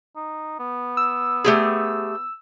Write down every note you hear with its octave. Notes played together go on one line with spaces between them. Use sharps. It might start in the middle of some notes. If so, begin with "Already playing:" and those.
D#4
B3
E6
A3 G4 G#4